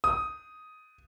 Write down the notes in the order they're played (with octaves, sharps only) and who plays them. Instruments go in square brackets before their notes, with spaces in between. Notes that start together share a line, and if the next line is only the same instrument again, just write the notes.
[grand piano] D#6